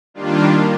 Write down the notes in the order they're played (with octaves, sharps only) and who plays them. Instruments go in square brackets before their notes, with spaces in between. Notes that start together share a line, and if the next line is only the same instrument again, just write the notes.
[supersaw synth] D#3 G3 A#3 D4 F4